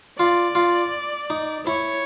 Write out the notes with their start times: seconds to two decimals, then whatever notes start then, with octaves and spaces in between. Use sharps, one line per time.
0.19 F4 D5
0.55 F4
1.30 D#4
1.66 E4 C#5